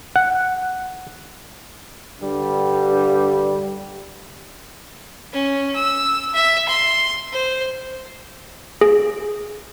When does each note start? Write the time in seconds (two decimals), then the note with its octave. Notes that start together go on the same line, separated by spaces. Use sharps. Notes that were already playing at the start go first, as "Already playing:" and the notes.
0.16 F#5
2.21 G2 D3 G3
5.33 C#4
5.75 E6
6.34 E5
6.68 C6
7.32 C5
8.81 G#4